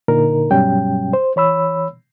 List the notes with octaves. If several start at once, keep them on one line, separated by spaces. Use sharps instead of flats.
A#2 D3 D#4 A#4
G2 B2 F#3 G3 C#4 G5
C5
E3 C#5 B5 E6